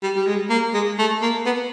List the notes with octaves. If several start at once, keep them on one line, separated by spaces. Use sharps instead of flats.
G3
G3
G#3
A#3
G#3
A3
A#3
B3